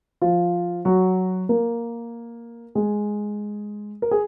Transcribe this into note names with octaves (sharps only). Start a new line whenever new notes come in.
F3 F4
F#3 F#4
A#3 A#4
G#3 G#4
A#4
G#4